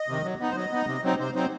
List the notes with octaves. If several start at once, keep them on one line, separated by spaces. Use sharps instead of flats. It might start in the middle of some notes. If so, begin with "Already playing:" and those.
Already playing: D#5
C3 D#3
F#3
B3 D#4
C5
F#3 D#5
B3 D#4
C3
F#3 C4 D#4
C3 C5
F#3 C4 D#4 C5